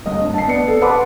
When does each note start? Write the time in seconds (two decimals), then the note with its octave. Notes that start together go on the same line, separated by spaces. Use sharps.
0.06 G1 D#5
0.21 G2
0.34 A5 C7
0.48 B3 D5 C#7
0.68 A4
0.81 B4 F#5 A5 B5 C6 D6